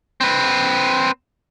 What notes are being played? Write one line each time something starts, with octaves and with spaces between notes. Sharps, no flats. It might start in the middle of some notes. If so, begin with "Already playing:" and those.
C4 B4